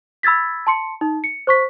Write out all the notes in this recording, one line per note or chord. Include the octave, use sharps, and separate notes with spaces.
B5 E6 G#6 A6 B6
A5 C6 C#7
D#4
C#7
C5 C#6 B6